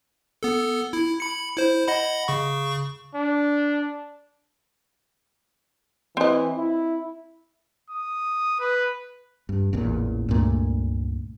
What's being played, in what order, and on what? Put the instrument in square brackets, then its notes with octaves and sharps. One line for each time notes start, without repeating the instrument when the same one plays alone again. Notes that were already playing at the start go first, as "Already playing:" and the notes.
[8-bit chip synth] B3 A4
E4
B5 C#7
E4 C5
D#5 F#5 B5
C#3 C#6
[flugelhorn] D4
[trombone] E3 [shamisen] C4 D#5
[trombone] E4
[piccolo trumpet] D#6
B4
[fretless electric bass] G2
A1 E2 A#2
C#2 G2 A#2 A3